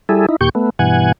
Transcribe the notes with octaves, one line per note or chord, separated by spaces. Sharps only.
G3 E4 G#4 A4
D#4 E4
D#2 A#2 G4 C#6 G6
A3 B3
G2 B2 E3 F#5 G#5